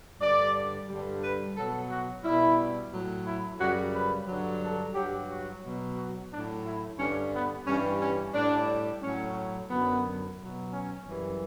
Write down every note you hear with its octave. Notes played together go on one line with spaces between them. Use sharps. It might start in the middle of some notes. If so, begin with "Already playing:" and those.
G2 D3 G3 D5
G2 D3 G3
B4
B2 F#3 A4
F#4
B2 G3 E4
A2 F#3
E4
F#2 C#3 G3 F#4
B4
G2 D3 F#3
A4
G2 F#3 G4
F#4
B2 F#3
F#4
A2 F#3 D4
E4
G2 D3 G3 C#4
B3
G2 E3 G3 C#4
C#4
A2 G3 D4
A2 F#3 C#4
F#2 D3 F#3 B3
B2 F#3
C#4
F#2 E3 G3